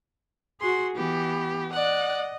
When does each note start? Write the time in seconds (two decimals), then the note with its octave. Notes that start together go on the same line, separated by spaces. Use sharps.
0.61 F#4 G#4 C6
0.96 E3 B3 G4
1.73 D5 D#5 F#5 F#6